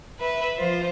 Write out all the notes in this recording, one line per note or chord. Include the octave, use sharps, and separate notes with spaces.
B4 E5
F3 F4 C5